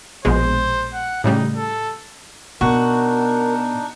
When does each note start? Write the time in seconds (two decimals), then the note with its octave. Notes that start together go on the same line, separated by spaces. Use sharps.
0.25 A#1 B2 G#3 C5
0.94 F#5
1.24 A2 C#3 G3 D#4
1.57 A4
2.61 B2 D4 D#4 F#4 A#4